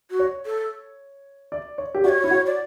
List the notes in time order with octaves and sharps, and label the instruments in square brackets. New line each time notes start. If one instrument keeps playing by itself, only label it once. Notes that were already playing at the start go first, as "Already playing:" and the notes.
[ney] F#4
[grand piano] C#5
[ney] A4
[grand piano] D5
C#5
G4
[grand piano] F#4 [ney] D5
[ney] C#5
[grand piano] E4
F#4
[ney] D5